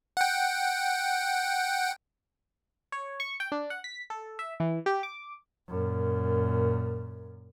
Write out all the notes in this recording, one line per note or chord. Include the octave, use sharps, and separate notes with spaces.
F#5 G5
C#5
C#6
G5
D4
F#5
B6
A4
E5
E3
G4
D6
F#2 A#2